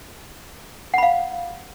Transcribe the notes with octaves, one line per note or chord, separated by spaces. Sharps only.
F5 F#5 B5